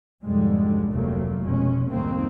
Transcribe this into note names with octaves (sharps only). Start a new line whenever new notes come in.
B1 F2 G#2 D3 G3 G#3
F1 D2 C3 F#3 A3 A#3
F1 F2 B2 G#3 C#4
C2 F2 G#2 D#3 A#3 C4